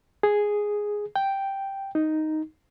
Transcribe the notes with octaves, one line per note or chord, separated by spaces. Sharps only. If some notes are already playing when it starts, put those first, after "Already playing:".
G#4
G5
D#4